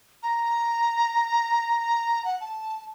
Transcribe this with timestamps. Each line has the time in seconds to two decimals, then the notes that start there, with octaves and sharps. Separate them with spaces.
0.23 A#5
2.25 F#5
2.41 A5